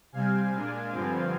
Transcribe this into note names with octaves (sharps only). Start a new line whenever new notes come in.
C3 G3 C4 F5 G#5
A#2 G#3 D4
G2 D3 F3 C4